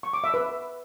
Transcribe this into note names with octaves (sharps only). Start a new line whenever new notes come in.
C#6
D6
E5
B4